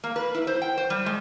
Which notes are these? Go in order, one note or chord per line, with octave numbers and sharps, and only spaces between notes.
A#3
B4
E4
C5
G5
C5
G3
G#3